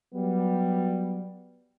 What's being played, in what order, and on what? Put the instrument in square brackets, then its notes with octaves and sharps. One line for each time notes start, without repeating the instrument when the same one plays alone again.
[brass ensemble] F#3 G3 B3